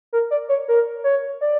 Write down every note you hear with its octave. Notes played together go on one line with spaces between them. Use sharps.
A#4
D5
C#5
A#4
C#5
D5